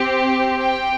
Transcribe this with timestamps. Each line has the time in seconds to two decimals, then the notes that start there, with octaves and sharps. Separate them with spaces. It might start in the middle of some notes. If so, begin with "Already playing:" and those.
Already playing: C4 G4
0.58 G5